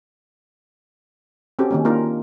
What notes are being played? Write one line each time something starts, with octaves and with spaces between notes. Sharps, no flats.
C4 C#4 F#4 G4 A4
D#3 A#3 C#4
A#3 D4 D#4 F4 A#4